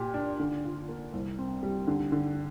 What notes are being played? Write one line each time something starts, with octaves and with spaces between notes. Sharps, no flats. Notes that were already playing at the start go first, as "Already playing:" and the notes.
Already playing: A#2 G4
D4
D3
F4
A#3
C2
C4
G3
D3
D3